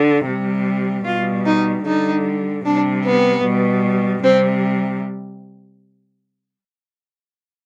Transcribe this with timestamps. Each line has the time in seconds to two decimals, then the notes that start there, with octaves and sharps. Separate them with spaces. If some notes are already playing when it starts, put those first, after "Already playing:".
Already playing: D3
0.26 C3 G3
1.05 B2 G3 F4
1.46 D#4
1.85 D3 G3 D#4
2.65 C3 G3 D4
3.05 B3
3.44 B2 G3
4.23 C3 G3 C4